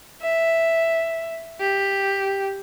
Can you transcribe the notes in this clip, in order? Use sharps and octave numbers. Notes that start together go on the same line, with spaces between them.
E5
G4